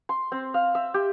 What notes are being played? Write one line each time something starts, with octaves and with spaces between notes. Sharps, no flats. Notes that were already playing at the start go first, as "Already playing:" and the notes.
C6
C4
F5
E5
G4